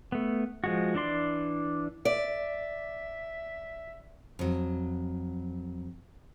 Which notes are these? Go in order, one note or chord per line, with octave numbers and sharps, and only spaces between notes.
A3 B3
F3 G#3 F#4
E3 D4 D5 C6
D5 E5
F2 F#3